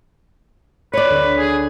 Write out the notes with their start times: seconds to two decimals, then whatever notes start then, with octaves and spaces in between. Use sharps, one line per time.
0.93 B4 C#5 D5
1.10 D2
1.39 G#4